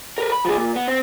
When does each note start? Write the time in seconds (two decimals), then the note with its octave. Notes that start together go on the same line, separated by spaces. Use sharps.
0.18 A#4 B4
0.32 B5
0.45 F3 G#4
0.57 A#2
0.76 B3
0.88 C4